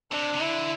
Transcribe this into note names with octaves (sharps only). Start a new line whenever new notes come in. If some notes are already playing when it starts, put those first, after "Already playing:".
C3 D4
C3
D3 E4